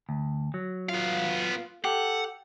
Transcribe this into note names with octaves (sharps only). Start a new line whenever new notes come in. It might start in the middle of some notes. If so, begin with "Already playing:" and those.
D2
F#3
B3 F4 F5
G4 A4 F#5